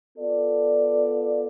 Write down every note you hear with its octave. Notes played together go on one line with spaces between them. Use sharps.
B3 F4 A4 D5